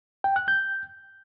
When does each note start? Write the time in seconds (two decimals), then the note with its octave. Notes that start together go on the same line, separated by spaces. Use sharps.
0.24 G5
0.36 F#6
0.48 G6